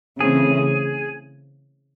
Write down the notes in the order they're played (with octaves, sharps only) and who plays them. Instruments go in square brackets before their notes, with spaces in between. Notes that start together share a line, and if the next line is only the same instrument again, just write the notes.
[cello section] C#3 E3 A3 C4 [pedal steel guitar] G#4